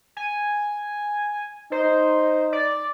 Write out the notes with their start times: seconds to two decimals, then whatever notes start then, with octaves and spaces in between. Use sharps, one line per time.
0.16 G#5
1.72 D#4 C5
2.52 D5